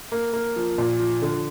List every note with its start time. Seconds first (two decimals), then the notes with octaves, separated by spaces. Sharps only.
0.12 A#3
0.33 A#3
0.56 F3
0.78 A#2
0.99 F3
1.22 D3